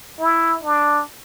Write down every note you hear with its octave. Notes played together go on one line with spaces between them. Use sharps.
E4
D4